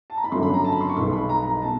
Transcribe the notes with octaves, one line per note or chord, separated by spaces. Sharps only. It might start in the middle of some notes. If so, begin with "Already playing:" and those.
A5
A#5
B5
G1 F2 C#3 F#3 A3 C6
B5
A#5
A5
B5
C6
C#6
B1 B2 G#3 B3 C6
B5
A#5
A#5
B2 A5